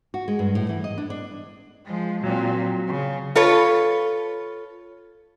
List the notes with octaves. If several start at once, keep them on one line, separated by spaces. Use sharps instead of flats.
F#4
G#3
G2
A2
E3
D#5
D4
D4
F3 G#3
A#2 F#3 C4
C#3
F4 A4 B4 C#5